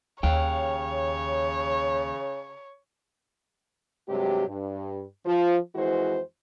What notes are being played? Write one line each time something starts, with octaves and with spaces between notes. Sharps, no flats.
D#2 C#3 C#5 F5 G5
G2 C3 F#3 G#3 G4
G2
F3
F2 E3 G#3 E4 F#4 C5